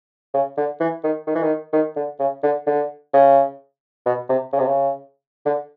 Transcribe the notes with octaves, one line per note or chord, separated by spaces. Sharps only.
C#3
D3
E3
D#3
D#3
E3
D#3
D#3
D3
C#3
D3
D3
C#3
B2
C3
C#3
C3
C#3
D3